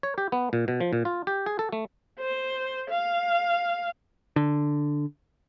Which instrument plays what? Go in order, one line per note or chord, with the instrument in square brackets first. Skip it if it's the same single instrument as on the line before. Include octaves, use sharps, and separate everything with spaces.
[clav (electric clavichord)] C#5
G4
B3
A#2
B2
F3
A#2
F4
G4
G#4
A4
A3
[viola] C5
F5
[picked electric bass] D3